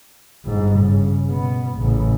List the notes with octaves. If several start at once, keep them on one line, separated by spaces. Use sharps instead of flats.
G1 G#2
C#3
B2 B3
A1 C#3